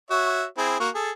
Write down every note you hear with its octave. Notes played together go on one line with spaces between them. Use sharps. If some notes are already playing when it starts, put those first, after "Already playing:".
F#4 C#5 E5
C4 E4 G#4
A#3 F#4 C#6
G#4 A4